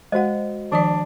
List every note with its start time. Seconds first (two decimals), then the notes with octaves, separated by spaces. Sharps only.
0.12 G#3 F#4 C5 D#5 F#5
0.72 D#3 F3 D4 D5